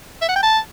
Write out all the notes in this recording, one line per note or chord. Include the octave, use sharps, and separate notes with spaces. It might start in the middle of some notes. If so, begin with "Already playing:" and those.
E5
F#5
G5
A5